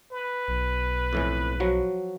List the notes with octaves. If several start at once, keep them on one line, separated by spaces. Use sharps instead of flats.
B4
B1
F2 A2 E3
F3 F#3 F#4